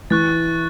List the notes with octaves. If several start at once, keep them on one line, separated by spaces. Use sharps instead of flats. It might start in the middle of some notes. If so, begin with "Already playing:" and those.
E3 C#6 F#6 A6